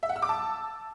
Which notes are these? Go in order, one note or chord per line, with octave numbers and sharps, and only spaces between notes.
E5
F#5
E6
D6
A5